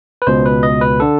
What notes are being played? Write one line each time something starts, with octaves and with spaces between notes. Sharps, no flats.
B4
C#2 B2 C5
B4
D#5
B4
D3 A4